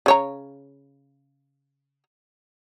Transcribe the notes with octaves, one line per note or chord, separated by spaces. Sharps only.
C#3 C#5 A#5